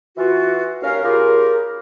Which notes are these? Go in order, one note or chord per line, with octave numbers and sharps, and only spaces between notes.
E3 F4 F#4
D#2 C#4 A#4 F5
C#3 F4 G4 G#4 A#4